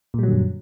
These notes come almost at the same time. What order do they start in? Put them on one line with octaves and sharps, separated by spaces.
A#2 G3 F#3 D3 F#2